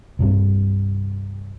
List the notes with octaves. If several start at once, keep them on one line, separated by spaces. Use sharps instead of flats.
C2 G2 C3